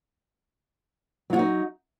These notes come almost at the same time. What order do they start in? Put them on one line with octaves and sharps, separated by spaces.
F#3 F4 F#4 D#4